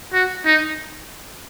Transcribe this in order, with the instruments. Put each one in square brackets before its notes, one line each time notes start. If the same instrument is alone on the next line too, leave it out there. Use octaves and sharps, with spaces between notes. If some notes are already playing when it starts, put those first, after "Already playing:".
[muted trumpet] F#4
D#4